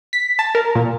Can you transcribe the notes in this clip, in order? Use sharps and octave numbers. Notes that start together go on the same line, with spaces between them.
B6
A5
A#4
A#2